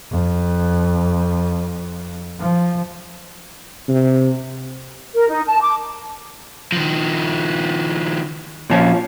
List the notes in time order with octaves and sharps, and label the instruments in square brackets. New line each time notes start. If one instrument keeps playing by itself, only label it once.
[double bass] F2
F3
[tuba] C3
[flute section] A#4
D#4
A5
D6
[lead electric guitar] D#3 F3
[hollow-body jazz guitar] A#2 F3 C#4